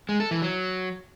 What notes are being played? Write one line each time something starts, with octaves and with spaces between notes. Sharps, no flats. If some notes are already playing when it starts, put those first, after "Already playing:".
G#3
A4
E3
F#3